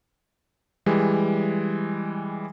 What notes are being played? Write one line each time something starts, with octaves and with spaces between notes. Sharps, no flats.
E3 G3 G#3